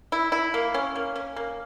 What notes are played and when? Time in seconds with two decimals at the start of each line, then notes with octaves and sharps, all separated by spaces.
0.12 E4
0.32 E4
0.54 A#3
0.74 C#4
0.96 A#3
1.16 C#4
1.36 A#3